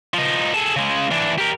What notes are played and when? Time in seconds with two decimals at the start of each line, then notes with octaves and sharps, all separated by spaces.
0.14 F3 D#4
0.53 G#4 A4
0.76 C#3 G#3
1.11 E3 D4
1.38 G4 A#4